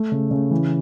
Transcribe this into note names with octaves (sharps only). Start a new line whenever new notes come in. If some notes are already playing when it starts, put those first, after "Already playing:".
Already playing: A3
C#3
C#3
E3